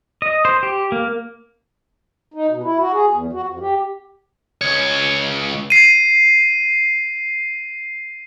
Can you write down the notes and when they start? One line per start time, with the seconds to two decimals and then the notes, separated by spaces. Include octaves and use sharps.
0.22 D#5
0.45 C5
0.63 G4
0.92 A#3
2.34 D#4
2.48 B2
2.63 E4
2.80 F#4
2.92 G#4
3.10 E2
3.33 F#4
3.46 F2
3.60 G4
4.61 C#2 C#5
5.70 C7 D#7